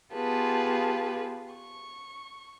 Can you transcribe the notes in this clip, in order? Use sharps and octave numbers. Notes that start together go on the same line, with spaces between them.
B3 F4 G4 G#4 B4 A5
C#6